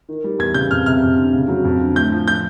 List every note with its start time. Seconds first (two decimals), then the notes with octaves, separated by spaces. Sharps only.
0.09 D#3
0.24 G3
0.39 E2 G#6
0.54 C#3 G6
0.71 F2 F6
0.86 C3 F6
1.02 F2
1.17 D3
1.33 C#3
1.48 F#3
1.65 F2
1.81 D3
1.95 A2 G6
2.12 F3
2.28 G6